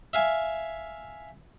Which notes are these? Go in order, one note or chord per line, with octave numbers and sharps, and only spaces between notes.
E5 F5 G#5